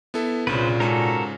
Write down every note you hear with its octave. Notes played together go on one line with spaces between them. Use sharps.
B3 E4 A4
C2 G2 A#2 C#3 B4 C5
G#2 C#3 F#4 A4 A#4 G#5